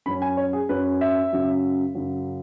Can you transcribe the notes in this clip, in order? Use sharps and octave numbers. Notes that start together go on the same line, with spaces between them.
F#2 F#3 C#4 B5
G#5
C#5
G#4
F#2 F#3 C#4 B4
E5
F#2 C#3 F#3
F#2 C#3 F#3